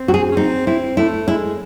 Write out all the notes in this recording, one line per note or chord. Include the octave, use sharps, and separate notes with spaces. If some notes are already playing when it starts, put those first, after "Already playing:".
Already playing: C4
F#4
G#4
C#4
C4 D#4
C4 E4
A3 E4
G#3 E4